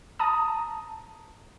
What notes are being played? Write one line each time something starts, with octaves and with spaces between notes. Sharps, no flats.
A5 A#5 D#6